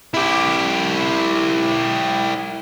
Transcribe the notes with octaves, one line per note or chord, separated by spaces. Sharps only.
E4 G4